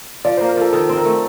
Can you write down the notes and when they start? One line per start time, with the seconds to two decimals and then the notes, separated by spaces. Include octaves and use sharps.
0.25 F3 D5
0.37 C5
0.41 A#3
0.49 A#4
0.57 F3 A4
0.73 D#3 A4
0.88 C4 C5
0.97 A#4
1.05 A3